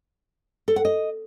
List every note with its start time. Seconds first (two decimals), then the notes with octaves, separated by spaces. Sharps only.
0.68 A4
0.76 F#5
0.85 D#5